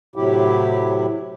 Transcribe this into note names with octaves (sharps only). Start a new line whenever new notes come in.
A2 C3 F#3 E4 G4